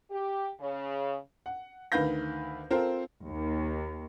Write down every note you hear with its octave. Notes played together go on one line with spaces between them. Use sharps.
G4
C#3
F#5
D2 D#3 B4 F5 G6 A#6
C4 F4 A4 A#4 C5
D#2